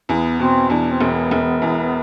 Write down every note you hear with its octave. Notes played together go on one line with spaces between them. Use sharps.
E2 B3
B2 C4
E2 D4
C4
E1
B3
E1
E2